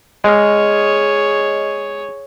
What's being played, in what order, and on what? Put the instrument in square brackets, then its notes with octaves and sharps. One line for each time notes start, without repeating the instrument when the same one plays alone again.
[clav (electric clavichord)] G#3 [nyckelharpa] G#4 C#5 [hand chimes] D#5 F6